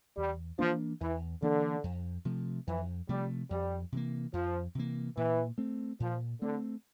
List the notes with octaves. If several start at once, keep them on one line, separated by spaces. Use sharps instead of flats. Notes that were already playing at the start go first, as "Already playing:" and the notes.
E2 G3
E3 F3 A#3 D4
E2 E3
D3 E3 A#3 D4
F2
C3 F3 A3
F2 E3
C3 F3 G3 A3
F2 G3
C3 E3 A#3
F2 F3
C3 E3 A#3
A#2 E3
A3 C4
A#2 F3
D3 A3 C4